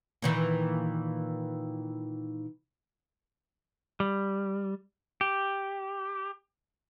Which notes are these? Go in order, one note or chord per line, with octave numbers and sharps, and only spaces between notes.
A#2 D#3 E3
G3
G4